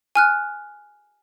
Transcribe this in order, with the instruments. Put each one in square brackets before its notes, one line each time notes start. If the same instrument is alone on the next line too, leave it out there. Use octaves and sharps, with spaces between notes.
[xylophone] G#5 F6 F#6